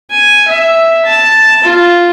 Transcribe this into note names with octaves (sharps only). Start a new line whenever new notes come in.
G#5
E5
A5
F4